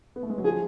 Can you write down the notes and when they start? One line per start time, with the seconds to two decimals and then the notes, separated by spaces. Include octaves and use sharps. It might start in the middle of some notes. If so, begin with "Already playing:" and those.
0.16 B3
0.23 A3
0.30 G#3
0.38 F#3
0.44 F3 G#4